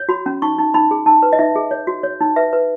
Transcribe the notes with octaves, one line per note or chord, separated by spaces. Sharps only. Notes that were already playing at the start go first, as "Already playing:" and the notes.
Already playing: C#5
F#4 B5
C#4
D#4 C#6
D#4
D#4 B5
G#4
D#4 A5
B4
D#5
D#4 E5
G#4
C#5
F#4
C#5
D#4
B4 E5
B4